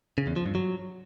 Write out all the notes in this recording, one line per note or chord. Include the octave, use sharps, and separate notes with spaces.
C#3
E2
F3
G2
F#3